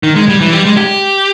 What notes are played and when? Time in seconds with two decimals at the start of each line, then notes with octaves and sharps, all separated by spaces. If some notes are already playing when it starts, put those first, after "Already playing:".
0.03 D#3
0.16 G#3
0.29 G3
0.41 E3
0.53 G3
0.65 G#3
0.77 G4